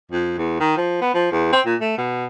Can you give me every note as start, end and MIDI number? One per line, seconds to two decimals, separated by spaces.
0.12 0.34 41
0.38 0.55 40
0.60 0.72 51
0.77 0.98 53
1.02 1.11 59
1.14 1.30 53
1.32 1.52 40
1.53 1.61 60
1.66 1.76 46
1.81 1.98 57
1.98 2.26 47